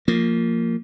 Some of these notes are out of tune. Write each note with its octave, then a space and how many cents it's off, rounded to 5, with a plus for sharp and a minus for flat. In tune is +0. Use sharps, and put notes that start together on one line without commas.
F3 +0 A#3 -20